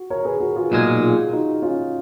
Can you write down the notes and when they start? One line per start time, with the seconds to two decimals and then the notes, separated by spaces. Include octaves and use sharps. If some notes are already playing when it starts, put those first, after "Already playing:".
Already playing: F#4
0.10 A#4 C#5
0.25 G#4 B4
0.41 F#4 A#4
0.56 F4 G#4
0.71 B1 A#2 G#3 D#4 F#4
1.01 F4 G#4
1.32 D#4 F#4
1.62 C#4 F4